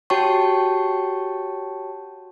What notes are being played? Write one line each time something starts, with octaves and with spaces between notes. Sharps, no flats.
F#4 G4 C#5 G5 A5 C#6